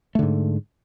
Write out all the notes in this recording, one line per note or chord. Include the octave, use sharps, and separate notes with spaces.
G#2 D3 A3